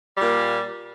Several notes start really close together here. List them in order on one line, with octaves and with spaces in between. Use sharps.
G3 A#2 A#3